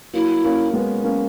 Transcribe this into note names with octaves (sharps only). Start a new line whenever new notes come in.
F#3 A#3 E4
A#3 C#4
G#3 B3
A#3 C#4